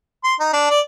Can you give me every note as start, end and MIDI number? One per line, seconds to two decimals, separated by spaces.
0.24 0.35 84
0.40 0.49 63
0.53 0.67 62
0.70 0.80 74